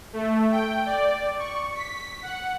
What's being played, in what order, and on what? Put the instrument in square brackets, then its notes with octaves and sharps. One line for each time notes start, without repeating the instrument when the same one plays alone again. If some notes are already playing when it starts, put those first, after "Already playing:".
[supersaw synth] A3
G5
D5
C#6
B6
F#5